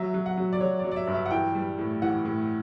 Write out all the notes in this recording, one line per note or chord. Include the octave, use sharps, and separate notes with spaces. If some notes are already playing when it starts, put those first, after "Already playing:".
Already playing: F#3 E5
F#3
F#5
F#3
D5
F#3 C#5
D5
F#3
D5
E5
G2
E5
F#5
E3 G5
G3
A2
E3 F#5
A2